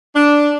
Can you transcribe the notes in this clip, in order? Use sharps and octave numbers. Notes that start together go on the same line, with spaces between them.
D4